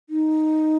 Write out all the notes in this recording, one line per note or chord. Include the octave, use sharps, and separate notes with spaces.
D#4